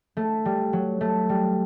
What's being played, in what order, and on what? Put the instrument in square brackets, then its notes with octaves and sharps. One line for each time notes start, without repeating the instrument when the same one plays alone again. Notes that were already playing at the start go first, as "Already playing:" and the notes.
[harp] A3
G3
F#3
A3
G3